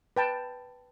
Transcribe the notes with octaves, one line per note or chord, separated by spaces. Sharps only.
B4 G5 A5